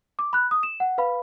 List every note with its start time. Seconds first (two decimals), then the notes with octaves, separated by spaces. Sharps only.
0.19 D6
0.33 B5 F#6
0.51 D#6
0.63 E7
0.80 F#5
0.98 B4 F5 B5